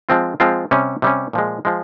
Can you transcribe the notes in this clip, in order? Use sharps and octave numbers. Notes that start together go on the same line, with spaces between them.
F3 G#3 C4 F4
F3 G#3 C4 F4
C3 G3 C#4
C3 G3 C#4
A#2 F3 G#3
F3 G#3